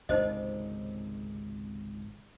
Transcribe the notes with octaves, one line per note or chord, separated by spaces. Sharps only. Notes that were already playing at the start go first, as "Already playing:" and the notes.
G#1 C#2 C3 D#4 C5 D#5